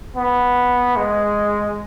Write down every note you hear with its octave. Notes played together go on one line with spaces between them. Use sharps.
B3
G#3